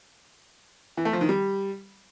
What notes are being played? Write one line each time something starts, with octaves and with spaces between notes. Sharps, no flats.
E3
A3
F3
D#3
G3